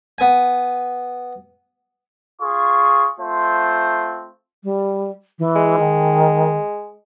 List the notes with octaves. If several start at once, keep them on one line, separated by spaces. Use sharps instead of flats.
B3 G#5
F4 G#4 C#6
A3 C4 F4 C5
G3
E3
G#3
D#3